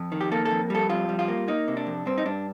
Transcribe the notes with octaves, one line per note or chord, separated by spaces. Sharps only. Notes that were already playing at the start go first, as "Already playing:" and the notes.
Already playing: F2
D#3
G4
A#3 A4
A4
F2
G3 A4
F2 F4
G3
F4
A#3
A#3 D#4
C3
D4
F2
G2 C4
D#4
G2 D4